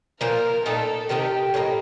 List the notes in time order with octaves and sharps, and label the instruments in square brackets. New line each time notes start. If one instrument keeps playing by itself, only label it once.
[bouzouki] A#2 F3 A#3 [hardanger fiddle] A#4
[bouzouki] A#2 A3 D#4 [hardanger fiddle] A4
[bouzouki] C3 D#3 A3 D#4 [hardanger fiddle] G4
[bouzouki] A2 F3 A#3 D#4